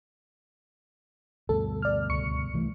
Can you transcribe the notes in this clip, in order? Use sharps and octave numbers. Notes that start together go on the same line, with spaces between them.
D2 G2 B2 A4
D5 F6
C#2 C#6 C#7
C2 E3 A3